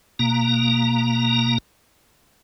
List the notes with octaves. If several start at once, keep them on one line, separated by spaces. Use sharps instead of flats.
B2 A#3 A#5